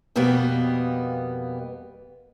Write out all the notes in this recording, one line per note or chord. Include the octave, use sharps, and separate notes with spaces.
F2 B2 G3 A#3 B3